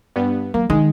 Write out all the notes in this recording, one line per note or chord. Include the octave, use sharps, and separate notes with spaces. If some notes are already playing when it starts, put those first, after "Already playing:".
G2 B3
F#3 A#3
D#3 G#3